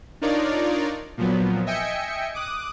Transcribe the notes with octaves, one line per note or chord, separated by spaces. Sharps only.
D4 D#4 F4 A#4 C#5 D5
A#2 F3 F#3 B3
D#5 E5 G5 G#5 C#7
D6 D#6 F#6